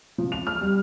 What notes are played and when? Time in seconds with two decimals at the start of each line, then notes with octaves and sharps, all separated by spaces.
0.18 F3
0.32 F7
0.47 F6
0.61 G3